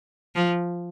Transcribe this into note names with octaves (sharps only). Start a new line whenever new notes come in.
F3